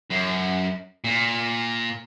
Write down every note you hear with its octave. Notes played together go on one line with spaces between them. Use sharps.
F#2
A#2